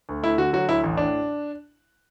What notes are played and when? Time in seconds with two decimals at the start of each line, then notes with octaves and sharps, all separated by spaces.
0.09 D2
0.23 A3 E4
0.38 D3 F#4
0.53 F#3 F#4
0.68 D2 E4
0.84 A1
0.97 A2 D4